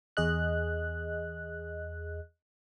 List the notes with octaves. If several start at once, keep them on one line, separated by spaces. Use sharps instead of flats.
E2 G#4 D#5 F#6